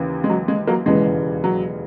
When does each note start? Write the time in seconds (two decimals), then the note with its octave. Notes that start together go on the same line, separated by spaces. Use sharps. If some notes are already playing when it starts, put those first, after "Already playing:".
Already playing: D#2 C#3 E3
0.24 G#3
0.29 F#3
0.48 G#3
0.67 F#3 A#3
0.86 E1 D#2 C#3 E3 G#3
1.44 F#3